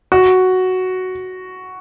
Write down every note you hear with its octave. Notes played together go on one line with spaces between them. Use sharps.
F#4